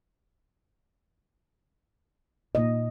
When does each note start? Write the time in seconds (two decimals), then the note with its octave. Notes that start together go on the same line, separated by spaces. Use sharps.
2.55 A#2 A#3 D#5